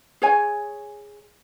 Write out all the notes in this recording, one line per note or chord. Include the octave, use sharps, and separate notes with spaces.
G#4 C#5 G#5